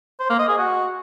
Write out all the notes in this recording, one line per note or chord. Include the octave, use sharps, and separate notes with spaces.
C5
A#3
D#5
G#4
F#4